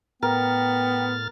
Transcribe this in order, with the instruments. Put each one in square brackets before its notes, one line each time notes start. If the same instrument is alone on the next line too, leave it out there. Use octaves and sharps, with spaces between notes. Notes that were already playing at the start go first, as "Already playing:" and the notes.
[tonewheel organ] A2 F6 A6 [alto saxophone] B3 [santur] A#4 [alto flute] G5